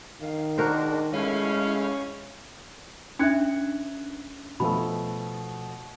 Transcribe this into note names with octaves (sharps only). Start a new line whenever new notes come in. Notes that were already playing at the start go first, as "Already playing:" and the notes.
D#3 F5
G#3 D4 F#4 A#4 C5
G#3 A3 C#4 E4 F5
C#4 D4 E5 F#6 G#6 C#7
B2 F3 A3 B5